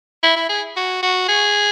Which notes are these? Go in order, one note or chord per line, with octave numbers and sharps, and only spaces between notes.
E4
E4
G#4
F#4
F#4
G#4